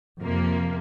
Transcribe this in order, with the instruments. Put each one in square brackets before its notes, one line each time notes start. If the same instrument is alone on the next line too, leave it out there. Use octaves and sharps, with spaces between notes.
[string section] F2 C3 F3 A#3